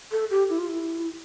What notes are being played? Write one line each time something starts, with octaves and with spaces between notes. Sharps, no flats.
A4
G4
E4
F4
E4